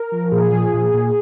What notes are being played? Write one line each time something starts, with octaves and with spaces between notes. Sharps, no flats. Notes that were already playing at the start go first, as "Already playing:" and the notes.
Already playing: A#4
F3
A#2 G#4
F3
A#2
A#2